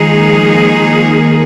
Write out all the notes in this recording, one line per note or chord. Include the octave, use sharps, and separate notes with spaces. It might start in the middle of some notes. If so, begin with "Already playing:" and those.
Already playing: D#3 F3 G#3 D#4 G#4
A#3
A#3
A#3